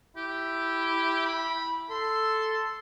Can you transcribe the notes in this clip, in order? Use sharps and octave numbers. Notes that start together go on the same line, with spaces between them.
E4 G4
B5
A4 C6